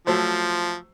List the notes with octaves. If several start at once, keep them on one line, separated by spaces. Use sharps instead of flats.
F3 F#3 A3 C5